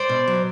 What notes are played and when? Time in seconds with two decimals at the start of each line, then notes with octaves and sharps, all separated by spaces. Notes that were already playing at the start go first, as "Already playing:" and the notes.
Already playing: C5 D5
0.09 B2
0.28 F#3